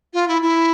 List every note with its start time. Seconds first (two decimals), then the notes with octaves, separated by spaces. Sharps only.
0.13 F4
0.28 E4
0.42 E4